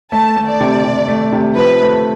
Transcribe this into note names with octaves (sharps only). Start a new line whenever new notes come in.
A3 A5
A3
D5
C3
C3
A3
C3
F3 B4
A3